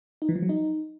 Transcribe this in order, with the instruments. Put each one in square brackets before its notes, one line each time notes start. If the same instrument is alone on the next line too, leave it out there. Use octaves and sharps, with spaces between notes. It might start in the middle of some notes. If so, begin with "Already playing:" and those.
[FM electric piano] D#4
E3
F3
F#3
D#4